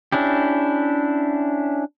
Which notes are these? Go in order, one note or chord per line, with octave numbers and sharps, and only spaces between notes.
C#4 D4 E4 G4